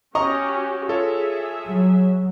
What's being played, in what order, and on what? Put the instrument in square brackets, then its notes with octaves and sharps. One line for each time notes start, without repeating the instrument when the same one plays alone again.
[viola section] C#4 F#4 G4 [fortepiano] D#5 A#5 C#6
[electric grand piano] F4 A4 C#5 [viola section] G#4 E5
[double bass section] F#3